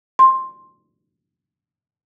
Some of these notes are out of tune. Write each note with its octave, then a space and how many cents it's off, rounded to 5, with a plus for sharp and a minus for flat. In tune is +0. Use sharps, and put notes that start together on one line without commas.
C6 +10